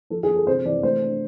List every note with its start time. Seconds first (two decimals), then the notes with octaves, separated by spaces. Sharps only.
0.10 F3 A4
0.23 G#4
0.29 F3
0.36 A4
0.47 C3 C5
0.65 E3 D5
0.83 A3 C5
1.01 D4